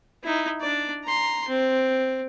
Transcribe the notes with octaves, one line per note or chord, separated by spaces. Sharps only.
D#4 E4
D4 D5
A#5 C6
C4